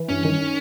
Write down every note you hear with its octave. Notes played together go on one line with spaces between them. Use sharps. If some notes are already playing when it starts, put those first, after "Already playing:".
Already playing: E3
G2 C#4
D#3